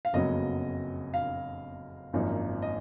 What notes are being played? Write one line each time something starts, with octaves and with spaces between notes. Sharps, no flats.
F5
F#1 F2 C#3 F#3 B3 D#5
F5
G#1 F#2 F3 A#3 D#4
D#5